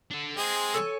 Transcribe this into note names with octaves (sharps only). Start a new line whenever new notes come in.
D4 A4
G#3 C4 G#4
A4 C#5 G#5